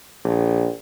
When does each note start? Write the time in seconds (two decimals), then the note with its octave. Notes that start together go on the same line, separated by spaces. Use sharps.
0.25 A#1